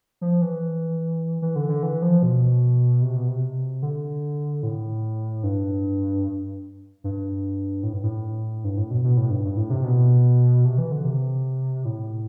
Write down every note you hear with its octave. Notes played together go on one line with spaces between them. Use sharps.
F3
E3
E3
D3
D3
E3
F3
B2
C3
B2
C3
D3
A2
G2
G2
A2
G2
A2
G2
A2
B2
B2
A2
G2
G2
A2
C3
B2
C3
E3
D3
C3
A2